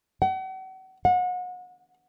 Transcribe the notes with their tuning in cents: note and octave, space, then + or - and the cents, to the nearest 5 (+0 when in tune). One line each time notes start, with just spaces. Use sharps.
F#5 +40
F#5 -35